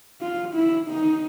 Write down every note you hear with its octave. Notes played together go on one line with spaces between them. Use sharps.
F4
E4
D#4